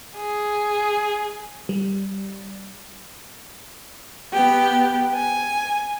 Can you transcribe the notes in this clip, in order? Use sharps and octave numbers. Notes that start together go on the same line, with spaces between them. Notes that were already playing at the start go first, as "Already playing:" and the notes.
G#4
G3
B3 G4
G#5